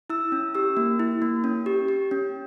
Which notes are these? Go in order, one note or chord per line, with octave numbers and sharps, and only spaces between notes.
E4 E6
C#4
G4 E6
A#3
E4
A#3
C#4
G4
G4
C#4